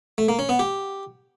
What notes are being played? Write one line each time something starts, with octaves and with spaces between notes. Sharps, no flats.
A3
A#3
C#4
B3
G4